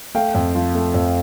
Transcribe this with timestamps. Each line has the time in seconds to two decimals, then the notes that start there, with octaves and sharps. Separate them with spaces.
0.15 A3 F5 G5
0.34 F2
0.55 F3
0.75 A3
0.94 F2